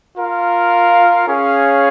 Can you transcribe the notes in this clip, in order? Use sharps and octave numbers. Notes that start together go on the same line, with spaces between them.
F4 A#4 F5
C#4 G#4 C#5 F5